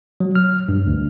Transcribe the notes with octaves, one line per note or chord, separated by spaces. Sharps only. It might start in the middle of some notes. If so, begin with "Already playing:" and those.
F#3
F6
G2
D2